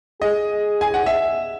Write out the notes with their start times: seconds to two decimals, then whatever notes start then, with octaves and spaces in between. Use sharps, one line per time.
0.22 G#4 D#5
0.81 G#5
0.94 F#5
1.06 E5